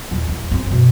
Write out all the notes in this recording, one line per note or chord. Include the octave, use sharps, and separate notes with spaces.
D#1
E2
F#2 C4
B2